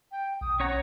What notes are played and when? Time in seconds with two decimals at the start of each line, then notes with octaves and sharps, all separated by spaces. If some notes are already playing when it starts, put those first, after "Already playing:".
0.12 G5
0.41 B1 D#6
0.60 C#4 C#5 F#5 A#5